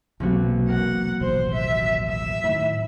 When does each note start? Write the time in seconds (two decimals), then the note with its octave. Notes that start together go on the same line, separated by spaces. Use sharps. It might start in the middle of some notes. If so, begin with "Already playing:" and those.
0.20 E1 B1 C3 F#3 A#3 F#4
0.68 A#4 F#5
1.21 D#1 A1 B2 C5 F#6
1.54 E5
2.08 E5
2.44 A2 D#3 B5